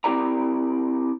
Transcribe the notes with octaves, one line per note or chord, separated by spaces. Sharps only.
C4 E4 G4 A#4 D5 A#5